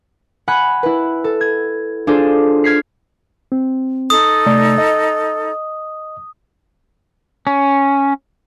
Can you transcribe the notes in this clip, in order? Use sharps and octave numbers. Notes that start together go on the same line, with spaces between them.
F#5 G#5 B5 F#6
E4 B4
A4
G#6
D4 F4 G#4 A4 C5
F6 G#6 B6 C7
C4
D#4 A4 D#6
C3 A3 D5
D#5
C#4